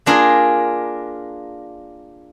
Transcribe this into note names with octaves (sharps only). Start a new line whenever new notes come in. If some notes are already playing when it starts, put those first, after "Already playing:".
A#3 D4 F4 G#4 A#4